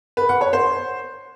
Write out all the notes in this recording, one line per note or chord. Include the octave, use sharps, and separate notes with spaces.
B4
F#5
C#5
C5